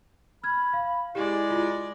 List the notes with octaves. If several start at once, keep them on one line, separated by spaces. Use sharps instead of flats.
B5 F6 G#6
F5
G#3 E4 G4 D5
F4